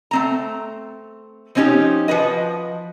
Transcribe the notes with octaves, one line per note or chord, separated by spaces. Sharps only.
A3 C4 A#5
F3 C4 C#4 D#4 G4
F3 F#4 B4 D#5